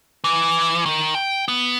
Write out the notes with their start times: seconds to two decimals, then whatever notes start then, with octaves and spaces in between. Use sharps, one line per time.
0.24 E3
0.86 D#3
1.15 G5
1.48 B3